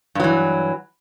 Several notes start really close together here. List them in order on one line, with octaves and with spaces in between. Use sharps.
G2 F#3 E3